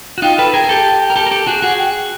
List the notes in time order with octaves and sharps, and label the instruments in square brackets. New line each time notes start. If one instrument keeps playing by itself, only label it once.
[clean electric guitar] F#4
[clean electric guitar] D#4 F4 [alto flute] G5
[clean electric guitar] A4 B4 [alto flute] G5
[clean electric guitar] G#4 A#4 [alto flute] G5
[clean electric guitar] G#4
G4 A4
A#4
G4 A4
A#4
G4 A4
F#4 G#4
[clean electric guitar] F#4 G#4 [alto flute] F#5
[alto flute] G5